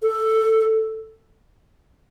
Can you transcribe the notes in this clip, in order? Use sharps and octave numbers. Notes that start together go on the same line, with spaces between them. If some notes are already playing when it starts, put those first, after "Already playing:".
A4